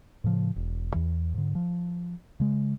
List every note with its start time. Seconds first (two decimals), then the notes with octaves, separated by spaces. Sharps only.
0.24 A2 C#3 F3
0.56 E1
0.94 E2 E3
1.34 G#2 D3
1.55 F3
2.40 C#3 G#3